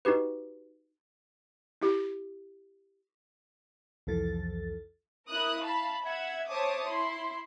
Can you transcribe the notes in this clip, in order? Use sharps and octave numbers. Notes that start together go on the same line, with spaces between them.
D#4 F#4 G4 B4
E4 G4
C2 F2 E3 F3 A4 A6
E4 A#4 D#6 F#6
F5 A5 B5
E5 F#5 G#6
C5 C#5 E5 A5 D6 D#6
E4 C6